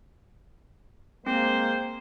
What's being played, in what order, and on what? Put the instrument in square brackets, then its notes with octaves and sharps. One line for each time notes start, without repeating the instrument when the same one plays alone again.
[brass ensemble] G#3 A#3 [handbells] C4 [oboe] C5